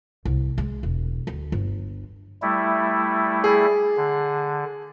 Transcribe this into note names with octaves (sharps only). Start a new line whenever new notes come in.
C2
G#3
E1
D2
G1
G3 A3 E4
G#4
D3